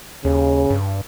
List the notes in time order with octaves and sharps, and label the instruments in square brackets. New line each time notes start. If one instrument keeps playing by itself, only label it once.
[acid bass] D#2 [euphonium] C#3
[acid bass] G2